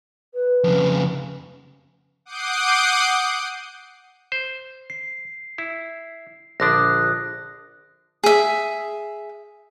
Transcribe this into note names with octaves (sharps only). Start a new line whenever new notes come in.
B4
F2 C#3
F#5 D6 D#6 G6 C7 D7
C5
C7
E4
A#1 D3 D4 D#6 F#6 A#6
G#4 E5